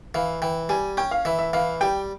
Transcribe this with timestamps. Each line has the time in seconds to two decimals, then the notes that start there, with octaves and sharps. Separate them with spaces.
0.15 E3 F5
0.42 E3 G5
0.69 G3 G#5
0.97 C#4 G5
1.11 F5
1.25 E3 E5
1.39 E5
1.53 E3 F5
1.81 G3 G5